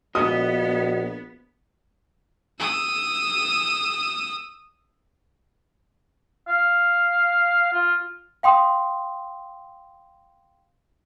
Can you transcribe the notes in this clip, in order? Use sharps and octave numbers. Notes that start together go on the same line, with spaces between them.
A#1 B3 F#4 D#5 D#6
D#6 E6
F5
F4
F5 G5 C6 D#6